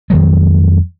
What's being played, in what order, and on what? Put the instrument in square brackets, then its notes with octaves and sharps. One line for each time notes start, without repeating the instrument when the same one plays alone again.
[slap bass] F2 D#3 F#3 G#3